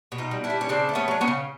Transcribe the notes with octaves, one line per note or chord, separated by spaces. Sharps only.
B2
D#4 F4
G3
D4 E4
G3
C#4
C#3 C4 D4
A3
B3 C#4
F#3 D4
B3 C#4
C#3